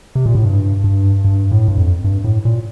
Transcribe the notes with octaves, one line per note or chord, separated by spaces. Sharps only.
C3
A#2
A2
G2
G2
G2
A2
G2
F2
G2
A2
A#2